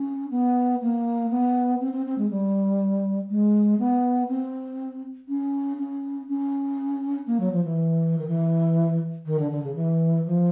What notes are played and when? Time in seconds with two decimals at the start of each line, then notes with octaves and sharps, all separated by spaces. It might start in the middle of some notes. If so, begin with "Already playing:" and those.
Already playing: C#4
0.31 B3
0.82 A#3
1.31 B3
1.81 C4
1.92 C4
2.06 C4
2.18 G#3
2.31 G3
3.30 G#3
3.79 B3
4.28 C4
5.28 C#4
5.78 C#4
6.28 C#4
7.27 A#3
7.40 F#3
7.52 F3
7.64 E3
8.18 D#3
8.27 E3
9.26 D#3
9.39 D3
9.51 D3
9.63 C#3
9.75 E3
10.25 F3